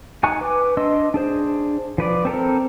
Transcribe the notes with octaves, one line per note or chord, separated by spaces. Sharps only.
D#4 G#5 C#6 F#6
B4 D6
D4 D#5 C6 E6
D4 G#4 C5
F3 B4 D5
C4 A4 A#4